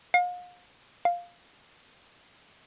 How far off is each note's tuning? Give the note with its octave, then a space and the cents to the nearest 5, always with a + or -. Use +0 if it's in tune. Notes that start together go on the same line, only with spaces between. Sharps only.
F5 +40
F5 +5